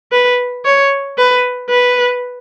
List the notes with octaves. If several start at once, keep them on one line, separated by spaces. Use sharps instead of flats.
B4
C#5
B4
B4